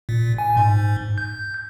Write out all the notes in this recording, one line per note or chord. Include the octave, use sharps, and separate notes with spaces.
A#2
G#5
G#2
G6